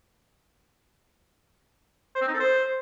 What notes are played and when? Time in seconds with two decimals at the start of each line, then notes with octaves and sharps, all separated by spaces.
2.15 C5
2.22 C4
2.28 D#4
2.34 A4
2.40 C5